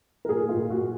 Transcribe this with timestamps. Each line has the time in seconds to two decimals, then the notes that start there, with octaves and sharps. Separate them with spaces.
0.25 A#4
0.29 A#2 G#4
0.49 F4
0.56 A#2
0.70 F#4